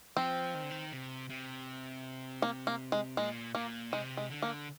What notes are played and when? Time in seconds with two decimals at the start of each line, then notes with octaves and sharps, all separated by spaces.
0.17 F3 C4
0.54 D#3
0.63 D3
0.71 D#3
0.92 C3
1.30 C3
2.42 A#3
2.67 A#3
2.92 G#3
3.17 A#2 G#3
3.55 A#2 A#3
3.92 C3 G#3
4.17 G#3
4.30 D3
4.42 A#3